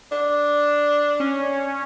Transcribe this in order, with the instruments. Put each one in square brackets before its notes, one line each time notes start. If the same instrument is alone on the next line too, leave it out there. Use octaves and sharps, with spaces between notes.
[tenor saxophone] D4
[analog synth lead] C#4